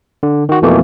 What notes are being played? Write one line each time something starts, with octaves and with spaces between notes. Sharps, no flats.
D3
D#3 F#4
F2 B2 E3 A3 A#3